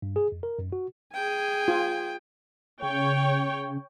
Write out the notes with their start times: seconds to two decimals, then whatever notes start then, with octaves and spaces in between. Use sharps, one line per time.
0.02 G2
0.16 G#4
0.32 F2
0.43 A#4
0.59 F#2
0.72 F#4
1.14 G#4 G5 G#5
1.68 F4
2.83 C#3 C#5 G5